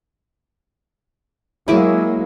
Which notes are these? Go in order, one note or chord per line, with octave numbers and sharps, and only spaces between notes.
F#3 G#3 A#3 E4 G#4 D6